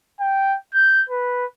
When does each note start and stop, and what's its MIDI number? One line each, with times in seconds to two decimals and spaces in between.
0.20 0.57 79
0.74 1.03 91
1.09 1.46 71